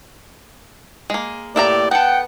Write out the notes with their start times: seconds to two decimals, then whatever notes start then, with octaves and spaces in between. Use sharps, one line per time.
1.10 G#3 A#3
1.56 A2 A#3 E4 G4 D5 E5 A#5
1.91 B3 A4 F#5 G5